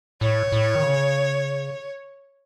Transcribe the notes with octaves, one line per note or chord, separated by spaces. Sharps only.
A2 C#5
A2
D#3
C#3